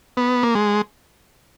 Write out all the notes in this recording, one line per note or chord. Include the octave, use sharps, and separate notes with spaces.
B3
A#3
G#3